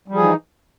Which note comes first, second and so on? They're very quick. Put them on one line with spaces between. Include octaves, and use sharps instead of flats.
G3 F3 G#4 E3 D#4